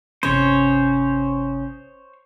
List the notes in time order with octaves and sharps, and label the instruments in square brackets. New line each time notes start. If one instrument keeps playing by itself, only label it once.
[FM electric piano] G1 C3 D#6 [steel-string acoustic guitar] C#4 [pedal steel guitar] C5 C#5